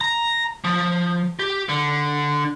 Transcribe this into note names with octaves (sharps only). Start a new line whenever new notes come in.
A#5
F3
G4
D3